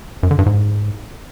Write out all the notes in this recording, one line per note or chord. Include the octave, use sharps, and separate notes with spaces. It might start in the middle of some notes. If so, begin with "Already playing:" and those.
F#2
D3
G2
G#2